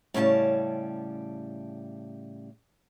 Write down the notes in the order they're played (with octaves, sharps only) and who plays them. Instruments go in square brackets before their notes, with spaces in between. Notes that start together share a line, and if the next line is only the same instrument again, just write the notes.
[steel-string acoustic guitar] A2 C#3 G3 C#4 D#5 A5